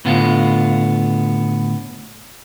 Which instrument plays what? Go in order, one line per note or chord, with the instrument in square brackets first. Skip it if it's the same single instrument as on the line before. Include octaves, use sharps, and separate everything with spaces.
[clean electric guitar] A2 D3 B3 F4